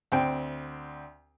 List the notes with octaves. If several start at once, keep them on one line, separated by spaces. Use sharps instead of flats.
D2 C4 G5